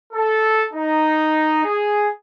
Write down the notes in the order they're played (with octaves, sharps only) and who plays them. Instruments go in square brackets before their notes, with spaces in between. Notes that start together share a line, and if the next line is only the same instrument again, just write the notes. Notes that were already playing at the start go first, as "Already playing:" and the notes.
[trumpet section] A4
D#4
G#4